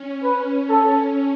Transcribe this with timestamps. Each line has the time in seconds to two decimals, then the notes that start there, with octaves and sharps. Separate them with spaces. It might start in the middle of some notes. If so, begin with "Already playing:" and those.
Already playing: C#4
0.23 B4
0.69 A4